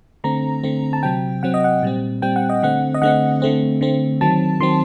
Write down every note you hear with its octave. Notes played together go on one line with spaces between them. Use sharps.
D3 A3 C4 A#5
D3 A3 C4
A5
C3 F#3 C4 G5
C3 F#3 C4 F#5
D#5
F#5
A#2 G3 C4
A#2 G3 C4 G5
F#5
D#5
D3 A3 C4 F#5
D#5
D3 A3 C4 F#5
D3 A3 C4
D3 A3 C4
D#3 F#3 C4 A5
D#3 F#3 C4 C6